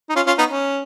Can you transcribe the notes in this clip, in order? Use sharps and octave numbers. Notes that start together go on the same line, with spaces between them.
D#4
C#4 F4
C#4 F4
B3 D#4
C#4